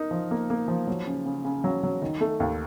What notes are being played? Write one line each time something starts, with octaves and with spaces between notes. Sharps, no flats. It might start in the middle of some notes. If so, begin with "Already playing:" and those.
Already playing: D#4 A#4
F3
A#3
A#3
F3
F#3
C#3
C#3
C#3
F#3
F#3
D#3
A3
D#2